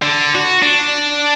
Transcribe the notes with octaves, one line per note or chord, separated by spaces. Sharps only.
D3
F#4
D4